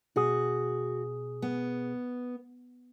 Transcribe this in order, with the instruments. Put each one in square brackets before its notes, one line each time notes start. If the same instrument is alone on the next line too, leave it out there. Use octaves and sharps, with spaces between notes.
[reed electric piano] B2 G#4 D#6 [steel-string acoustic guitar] F#4
[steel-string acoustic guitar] B3